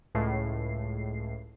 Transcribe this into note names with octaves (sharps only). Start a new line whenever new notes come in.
C#2 A2 C7